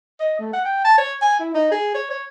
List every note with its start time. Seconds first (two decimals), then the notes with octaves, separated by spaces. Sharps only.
0.20 D#5
0.39 A3
0.53 F#5
0.65 G5
0.84 A5
0.98 C#5
1.22 G#5
1.39 E4
1.55 D#4
1.71 G#4
1.95 C#5
2.10 C#5